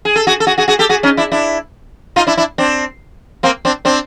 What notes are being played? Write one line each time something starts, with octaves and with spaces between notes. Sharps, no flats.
G#4
A4
F#4 G#4
A4
F#4 G#4
F#4 G#4
F#4 G#4
G4 A4
F#4 G#4
C#4 D#4
D4 E4
D4 E4
D#4 F4
D4 E4
D4 E4
C4 D4
A#3 C4
C4 D4
C4 D4